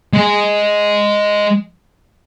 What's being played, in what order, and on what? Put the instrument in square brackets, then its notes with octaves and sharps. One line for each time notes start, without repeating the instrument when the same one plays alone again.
[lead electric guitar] G#3 G#5